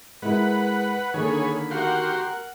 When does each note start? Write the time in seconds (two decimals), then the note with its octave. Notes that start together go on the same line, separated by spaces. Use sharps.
0.22 G#3 E4 A#4 B4 F#5
1.14 D3 D#3 A#3 G#4 C#5 B5
1.71 F#4 G4 A#4 F#5 C6